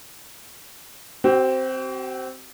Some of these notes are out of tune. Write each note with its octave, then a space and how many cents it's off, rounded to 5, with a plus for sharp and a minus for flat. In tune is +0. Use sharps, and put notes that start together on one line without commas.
C4 +0 F#4 +45